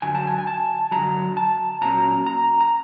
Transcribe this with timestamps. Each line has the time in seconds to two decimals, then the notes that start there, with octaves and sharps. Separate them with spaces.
0.02 F#2 D3 F#3 G#5
0.15 A5
0.27 G#5
0.38 G#5
0.47 A5
0.91 F#2 D3 F#3 A#5
1.37 A5
1.81 A#2 F#3 A#3 C#4 A#5
2.26 A#5
2.61 A#5